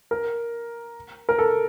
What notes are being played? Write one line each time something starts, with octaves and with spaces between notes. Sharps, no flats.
A#4
A#4
A4